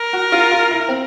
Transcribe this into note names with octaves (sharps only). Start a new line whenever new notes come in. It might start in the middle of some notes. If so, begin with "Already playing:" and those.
Already playing: A#4
F#4
F4
F4
E4
C4